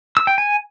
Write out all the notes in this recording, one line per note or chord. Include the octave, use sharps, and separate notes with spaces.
E6
G5
G#5